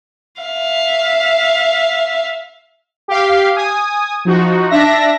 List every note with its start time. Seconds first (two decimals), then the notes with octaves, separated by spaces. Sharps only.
0.42 E5 F5
3.08 G4 F5
3.56 G#5 D#6
4.25 F3 D#4 F#4
4.70 D4 E5 A#6